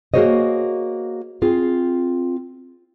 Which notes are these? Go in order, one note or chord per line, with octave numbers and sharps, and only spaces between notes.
A#3 F#4 G#4 C5 C#5 D#5
C4 F4 G#4